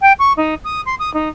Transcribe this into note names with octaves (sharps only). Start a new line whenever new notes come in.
G5
C#6
D#4
D#6
C6
D#6
D#4